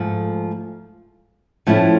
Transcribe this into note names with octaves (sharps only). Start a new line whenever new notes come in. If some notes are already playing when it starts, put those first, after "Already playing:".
Already playing: G#2 F3 A3
A2 F3 A3 C#4 E4